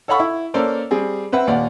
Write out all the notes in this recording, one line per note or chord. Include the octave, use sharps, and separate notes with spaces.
A4 C#5 F5 F#5 B5 C#6
E4
A#3 C#4 A4 C5 D5 F5
G3 C4 G#4
C4 B4 E5 F#5
D#2 A#2 D5 F5 F#5